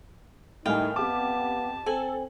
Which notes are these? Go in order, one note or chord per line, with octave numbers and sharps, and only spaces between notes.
A2 D#3 G3 D#4 F5 G5 G#5
F2 B3 G4 A5 D6
C4 A4 G#5 F#7